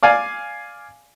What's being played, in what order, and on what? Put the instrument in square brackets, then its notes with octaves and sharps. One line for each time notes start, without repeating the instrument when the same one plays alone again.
[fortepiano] D5 F5 G#5